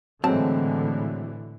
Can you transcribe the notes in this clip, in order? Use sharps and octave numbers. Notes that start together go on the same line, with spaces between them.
A2 D3 E3 F#3 G#3 C4 A5